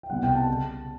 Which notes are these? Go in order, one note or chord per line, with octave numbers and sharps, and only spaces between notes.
G5
C2 B2 G3 F#5
G5
A5
C#3